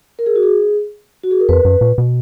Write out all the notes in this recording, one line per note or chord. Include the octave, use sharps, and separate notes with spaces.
A#4
G#4
F#4
G#4
F#4
G#4
A#4
F2 B4
F#2
A#2
B2